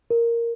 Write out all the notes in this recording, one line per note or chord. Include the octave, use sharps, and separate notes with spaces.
A#4